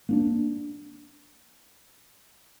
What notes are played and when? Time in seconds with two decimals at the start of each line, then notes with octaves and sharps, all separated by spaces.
0.09 A#3 C#4 D4